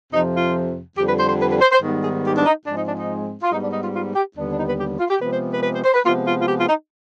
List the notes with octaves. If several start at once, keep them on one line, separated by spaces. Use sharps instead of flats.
F2 C3 F3 D#4
F4
F2 D3 G3 G4
B4
C5
C5
B4
B4
C5
C5
G#2 D#3 G3 B3
G#4
G4
D4
D#4
G#2 F3 G#3 C4 D4
D#4
D4
D#4
F4
G#2 G3 B3 D#4
D4
D#4
F4
F4
G4
D#2 D3 G3 B3 D4
D4
D#4
B4
G4
F4
G4
C3 F3 G#3 B3 B4
C5
B4
B4
C5
C5
B4
C3 F3 G#3 B3 F4
F4
F4
G4
F4
D#4